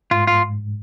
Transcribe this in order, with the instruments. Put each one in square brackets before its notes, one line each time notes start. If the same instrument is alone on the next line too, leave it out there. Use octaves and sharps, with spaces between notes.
[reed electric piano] G#2 [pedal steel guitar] F4
[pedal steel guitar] F4